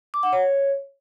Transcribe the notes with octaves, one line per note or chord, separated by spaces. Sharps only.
D6
F#5
C#5